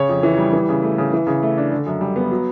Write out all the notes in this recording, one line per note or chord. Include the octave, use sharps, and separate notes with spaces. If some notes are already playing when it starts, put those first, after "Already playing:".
Already playing: C#3 C#5
F2
E3
G3
E3
C#3
A3
C#3
E3
C#3
A3
D4
D3
F#2
G3
B3
F#3